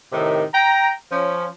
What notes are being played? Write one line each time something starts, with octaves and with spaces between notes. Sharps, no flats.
A2 C3 D#3
G5 A#5
F3 C#4